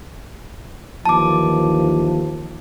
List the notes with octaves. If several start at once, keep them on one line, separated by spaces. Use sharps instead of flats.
D#2 E3 F3 A5 D6